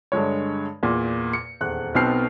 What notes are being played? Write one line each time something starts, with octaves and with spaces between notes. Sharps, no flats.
G2 D3 G#3 C#5
E2 A#2
C#7
D#1 E2 F#6
B1 B2 B3 C4 F6 C7